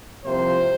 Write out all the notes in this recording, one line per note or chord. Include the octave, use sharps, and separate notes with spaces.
C2 C3 F3 A#3 C5